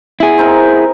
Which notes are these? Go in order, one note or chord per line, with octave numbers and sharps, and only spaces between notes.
E4 G#4
C4 D#4 A#4